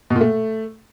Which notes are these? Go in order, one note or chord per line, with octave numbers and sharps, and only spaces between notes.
B2
A#2
A3